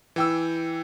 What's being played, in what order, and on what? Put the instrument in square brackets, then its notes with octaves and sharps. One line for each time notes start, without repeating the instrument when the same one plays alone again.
[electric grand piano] E3 G5 E6